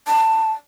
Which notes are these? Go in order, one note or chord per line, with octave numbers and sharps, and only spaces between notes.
A5